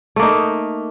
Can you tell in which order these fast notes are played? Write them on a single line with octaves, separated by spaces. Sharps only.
A3 A#3 D#4